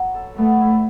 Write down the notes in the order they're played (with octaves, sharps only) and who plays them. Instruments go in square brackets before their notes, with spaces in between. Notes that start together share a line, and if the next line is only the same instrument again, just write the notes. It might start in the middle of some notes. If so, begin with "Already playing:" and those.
Already playing: [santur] F#3 B3
A4
[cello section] A3 [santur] B3
[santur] E4